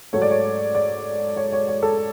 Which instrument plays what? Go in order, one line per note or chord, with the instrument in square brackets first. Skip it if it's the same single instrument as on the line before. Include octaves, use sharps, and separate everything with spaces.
[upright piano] G#2 F#3 A3 C#5
D5
C#5
D5
C#5
C#5
C#5
A4